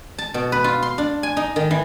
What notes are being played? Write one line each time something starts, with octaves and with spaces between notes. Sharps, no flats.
A5
B2
B4
F4
C6
D4
G#5
D#4
D#3
E3